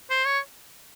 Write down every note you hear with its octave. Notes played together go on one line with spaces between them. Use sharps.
C5
C#5